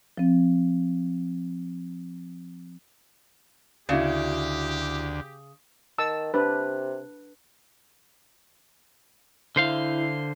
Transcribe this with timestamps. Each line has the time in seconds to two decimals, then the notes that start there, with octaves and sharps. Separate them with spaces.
0.18 F3 C4
3.89 D2 C#3 E4 F#4 G4 D5
5.98 D#3 A5 E6
6.34 C3 D4 B4
9.56 D3 E4 C5 F5